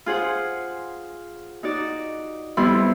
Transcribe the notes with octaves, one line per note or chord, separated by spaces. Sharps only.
F4 G#4 C5 F#5
D#4 F#4 D5
F2 G3 B3 E4 C6